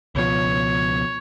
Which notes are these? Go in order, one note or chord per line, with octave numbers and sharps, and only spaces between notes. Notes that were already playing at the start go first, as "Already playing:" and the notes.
C#2 B2 F3 C#5